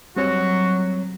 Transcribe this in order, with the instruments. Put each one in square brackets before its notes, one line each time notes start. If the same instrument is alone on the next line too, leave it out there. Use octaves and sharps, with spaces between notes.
[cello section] F#3 [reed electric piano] G3 C4 C#5 [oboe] F#4